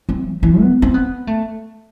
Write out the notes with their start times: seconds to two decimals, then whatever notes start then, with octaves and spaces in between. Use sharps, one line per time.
0.09 C4
0.25 E3
0.43 E3
0.60 B3
0.82 C4
0.94 B3
1.27 A3